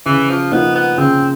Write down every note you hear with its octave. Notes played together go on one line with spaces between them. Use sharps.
C#3 E3
F3
F3 A#3 B3 D#4
B3
C#3 C4